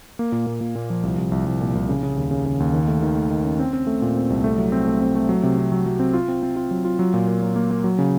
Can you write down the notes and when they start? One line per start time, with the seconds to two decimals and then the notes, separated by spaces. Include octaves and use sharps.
0.19 A#3
0.32 A#2
0.47 A#2
0.61 A#2
0.75 A#2
0.90 F3
1.03 C2
1.18 C2
1.32 C2
1.46 C2
1.61 A#2
1.75 C2
1.89 C#3
2.03 C#3
2.17 D#2
2.31 C#3
2.46 C#3
2.60 D#2
2.74 D#3
2.88 A3
3.02 D#3
3.16 A3
3.30 D#3
3.44 C#4
3.59 C4
3.73 C4
3.87 A3
4.02 A#2
4.16 C4
4.30 C2
4.44 A3
4.58 F#3
4.72 C4
4.87 A3
5.01 C4
5.15 A3
5.29 F#3
5.43 C3
5.58 C4
5.72 F#3
5.86 F#3
6.00 C4
6.14 F4
6.28 C4
6.43 C4
6.56 F4
6.71 F#3
6.85 F4
6.99 F#3
7.14 A#2
7.27 A#3
7.42 F#3
7.56 A#3
7.71 A#3
7.84 F#3
7.99 C#3